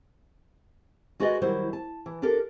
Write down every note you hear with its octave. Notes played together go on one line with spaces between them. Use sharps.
G#3 F#4 G#4 B4 D5 D#5
D#3 F#3 G3 E4 C5
A5
E3
D4 G4 A4 A#4